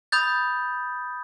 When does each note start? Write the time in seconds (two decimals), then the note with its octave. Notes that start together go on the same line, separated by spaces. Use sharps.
0.12 B5 D#6 G6 A6